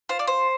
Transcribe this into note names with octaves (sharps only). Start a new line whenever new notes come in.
F4 C5
D5
C5